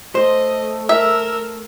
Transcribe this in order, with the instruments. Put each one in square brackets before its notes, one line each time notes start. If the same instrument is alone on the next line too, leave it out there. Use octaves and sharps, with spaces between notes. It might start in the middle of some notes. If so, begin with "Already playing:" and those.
[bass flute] A3 [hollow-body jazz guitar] C5 [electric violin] D#5
[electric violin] A#4 E6 [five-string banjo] E5